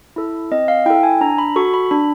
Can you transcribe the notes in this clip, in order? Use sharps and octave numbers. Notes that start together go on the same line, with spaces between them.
E4 A4
C4 D#5
F5
E4 A4 G5
G#5
D4 A#5
B5
F#4 A4 C#6
B5
D4 B5